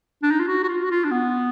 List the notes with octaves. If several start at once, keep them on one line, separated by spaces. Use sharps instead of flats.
D4
D#4
F4
F#4
F#4
F4
F#4
F4
D4
B3